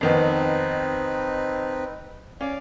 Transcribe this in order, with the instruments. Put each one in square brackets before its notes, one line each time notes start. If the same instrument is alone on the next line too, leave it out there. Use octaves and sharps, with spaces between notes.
[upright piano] F2 D#3 B3 [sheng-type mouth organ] C4 D#4 B4
[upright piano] C#4 [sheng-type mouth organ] D5 F5